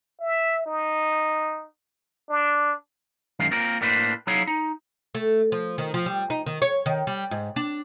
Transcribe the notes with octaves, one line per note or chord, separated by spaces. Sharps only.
E5
D#4
D4
F#2 D#3 G#3 F5
A#3 C4 F4 A#4
A2 A#3 D4 B4 C5
F#3 D#4 E4 G#4 C#5 F5
D#4
A3
F3
D#3
F3
G3
D#4
D#3
C#5
D#3
G3
G#2
D4